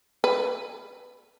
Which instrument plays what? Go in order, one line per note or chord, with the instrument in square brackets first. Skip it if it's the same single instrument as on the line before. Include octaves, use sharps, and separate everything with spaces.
[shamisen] B4